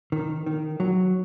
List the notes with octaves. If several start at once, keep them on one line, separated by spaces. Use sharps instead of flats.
D#3
D#3
F#3